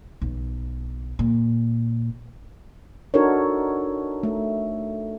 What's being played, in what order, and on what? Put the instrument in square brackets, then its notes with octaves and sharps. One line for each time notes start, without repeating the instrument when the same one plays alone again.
[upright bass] B1
A#2
[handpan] D4 D#4 F#4 A4 A#4 C#5
A3